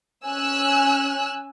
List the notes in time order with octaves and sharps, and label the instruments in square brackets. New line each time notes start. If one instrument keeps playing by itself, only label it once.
[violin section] C#4 G#5 E6 F#6